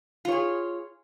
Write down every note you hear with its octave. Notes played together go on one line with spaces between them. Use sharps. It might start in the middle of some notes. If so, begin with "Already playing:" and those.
F4 G#4 C#5